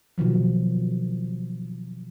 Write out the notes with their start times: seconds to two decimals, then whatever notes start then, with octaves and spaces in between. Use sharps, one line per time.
0.18 B2 D#3 F3 F#3